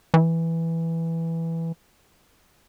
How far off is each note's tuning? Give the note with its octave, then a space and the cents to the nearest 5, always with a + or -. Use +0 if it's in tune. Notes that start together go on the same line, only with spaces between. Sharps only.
E3 +0